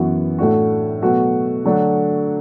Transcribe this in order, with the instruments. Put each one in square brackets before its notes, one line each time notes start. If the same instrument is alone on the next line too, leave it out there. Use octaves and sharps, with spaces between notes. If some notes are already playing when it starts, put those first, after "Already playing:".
Already playing: [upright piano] F#2 E3 B3 F#4
A2 A3 D4 F#4
B2 F#3 A3 F#4
D3 F#3 A3 D4 F#4